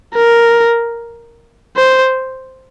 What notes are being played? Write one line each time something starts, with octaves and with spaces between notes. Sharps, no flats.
A#4
C5